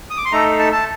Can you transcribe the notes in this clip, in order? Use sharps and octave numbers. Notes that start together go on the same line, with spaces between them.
D#6
D6
C6
A3 D#4 A4 A#5
A5
A5